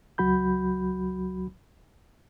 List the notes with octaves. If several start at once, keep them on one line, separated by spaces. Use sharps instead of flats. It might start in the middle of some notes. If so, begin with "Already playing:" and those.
C#2 F#3 F#4 B5 G6